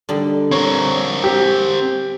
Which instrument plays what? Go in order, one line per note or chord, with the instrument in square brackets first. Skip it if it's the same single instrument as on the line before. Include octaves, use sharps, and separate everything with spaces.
[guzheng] D3 G3 D#4
[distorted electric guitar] C4 A#4 [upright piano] C#5
[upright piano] G4